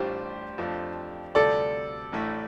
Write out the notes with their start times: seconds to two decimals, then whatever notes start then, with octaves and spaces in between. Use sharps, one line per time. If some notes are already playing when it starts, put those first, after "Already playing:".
Already playing: A1 A2 G3 D4 F4 G4 C5
0.58 F2 F3 A3 D4
1.35 D2 C3 G3 F4 A4 D5
2.12 A1 A2 A3